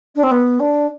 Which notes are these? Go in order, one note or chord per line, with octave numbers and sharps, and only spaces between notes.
D4
C4
B3
D4